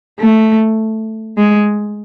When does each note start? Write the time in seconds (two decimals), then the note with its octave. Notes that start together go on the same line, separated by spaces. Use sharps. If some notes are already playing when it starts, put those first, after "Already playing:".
0.20 A3
1.37 G#3